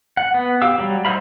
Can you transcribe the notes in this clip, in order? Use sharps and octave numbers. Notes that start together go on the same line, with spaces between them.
F#5
B3
G4 F5 E6
F#3 G3
D#4 E4 C5 F5 B5